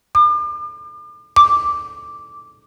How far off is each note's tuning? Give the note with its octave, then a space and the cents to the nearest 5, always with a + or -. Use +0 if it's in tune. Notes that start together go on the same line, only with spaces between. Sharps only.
D6 +40
D6 -5